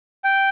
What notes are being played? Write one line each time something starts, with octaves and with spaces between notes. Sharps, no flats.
G5